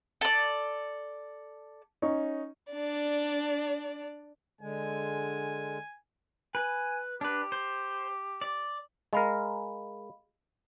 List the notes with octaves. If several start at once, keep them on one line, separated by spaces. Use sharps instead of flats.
A4 D5
C#4 D#4 C#6
D4 D5
D3 G#3 G#5
B4 G#5
D4 G4 B4
C5
D5
G#3 A#4 D#5 F5 B5